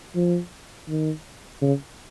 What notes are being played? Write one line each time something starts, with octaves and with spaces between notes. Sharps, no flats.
F3
D#3
C#3